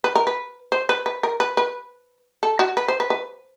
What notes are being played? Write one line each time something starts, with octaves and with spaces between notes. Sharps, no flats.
B4
A#4
B4
C5
B4
B4
A#4
B4
B4
A4
F#4
B4
C5
B4
B4